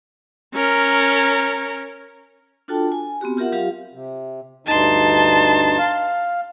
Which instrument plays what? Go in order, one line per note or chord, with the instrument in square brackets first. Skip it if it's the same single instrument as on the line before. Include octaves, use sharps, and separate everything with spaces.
[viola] C#4 A#4
[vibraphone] D4 F4 F#4 A4 G5 A5
G#5
B3 C4 F#4 G4
F4 G4 A#4 E5 F#5
F#3 F4 G4 F5
[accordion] C3
[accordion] D2 G2 D#4 [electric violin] A5 C6
[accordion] F5